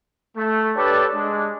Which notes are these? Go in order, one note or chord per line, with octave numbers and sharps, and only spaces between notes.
A3
D4 G4 A4 B4 C#5 D5
G#3 D4